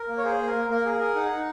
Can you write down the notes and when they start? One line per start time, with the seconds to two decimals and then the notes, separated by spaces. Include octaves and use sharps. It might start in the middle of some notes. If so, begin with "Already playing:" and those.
Already playing: A#4
0.08 A#3
0.18 C#5
0.24 G#4 C5
0.39 A#3
0.47 A#4
0.54 A#3
0.69 A#3 A#4
0.85 G#4
0.93 A#4
1.00 G#4
1.15 D#4 F#5
1.31 D#4